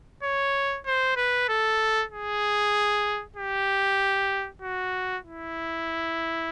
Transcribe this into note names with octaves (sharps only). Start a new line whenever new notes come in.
C#5
C5
B4
A4
G#4
G4
F#4
E4